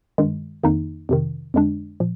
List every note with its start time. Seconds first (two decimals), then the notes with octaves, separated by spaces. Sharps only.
0.18 G2 D#3 G#3
0.64 F2 D#3 A#3 D#4
1.09 F2 C3 D#3
1.54 F2 D3 G#3 D4
2.00 A#2 F3